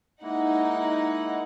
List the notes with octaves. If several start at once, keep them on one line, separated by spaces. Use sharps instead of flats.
G#3 A#3 D#4 E4 F#5